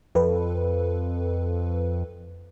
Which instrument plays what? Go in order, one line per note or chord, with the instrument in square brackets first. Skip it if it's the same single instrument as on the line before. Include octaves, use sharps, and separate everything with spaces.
[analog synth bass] F2 [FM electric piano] A4 B4